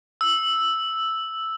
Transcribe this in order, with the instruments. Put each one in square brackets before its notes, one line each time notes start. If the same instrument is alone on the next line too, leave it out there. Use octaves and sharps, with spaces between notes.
[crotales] E6